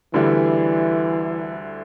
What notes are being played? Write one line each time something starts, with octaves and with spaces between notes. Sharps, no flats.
D2 D3 E3 G3 E4